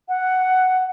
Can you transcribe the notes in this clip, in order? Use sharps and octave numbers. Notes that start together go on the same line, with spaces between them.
F#5